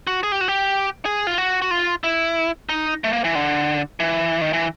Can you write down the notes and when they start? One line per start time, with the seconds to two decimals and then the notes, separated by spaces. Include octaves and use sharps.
0.07 F#4
0.23 G#4
0.32 G4
0.41 F#4
0.48 G4
1.05 G#4
1.27 F4
1.38 F#4
1.62 F#4
1.71 F4
2.04 E4
2.69 D#4
3.04 A3
3.13 A#3
3.24 E3
3.35 D3
4.00 E3
4.41 D#3
4.53 E3